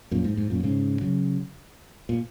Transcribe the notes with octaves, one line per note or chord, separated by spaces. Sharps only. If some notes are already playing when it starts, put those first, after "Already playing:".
F#2 A#2
G#2
G#2
F#2 A#2
G#2 C#3
C#3 F#3
A#2